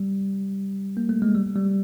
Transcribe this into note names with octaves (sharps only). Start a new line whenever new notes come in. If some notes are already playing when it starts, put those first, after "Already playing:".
Already playing: G3
A#3
A3
G#3
G3
G3